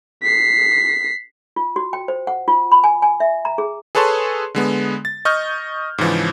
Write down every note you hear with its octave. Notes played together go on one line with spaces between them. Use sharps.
B6 C7
F4
F#4
G5
C5
F#5
F4
B5
G#5
G#5
E5
A#5
G#4
G#4 A4 B4 C#5 A5 C6
D3 G#3 B3
A6
D#5 C#6 F6 G6
G#2 C#3 E3 F3